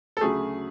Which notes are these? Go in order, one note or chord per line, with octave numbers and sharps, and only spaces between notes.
A4
D2 C#3 F#3 A3 G#4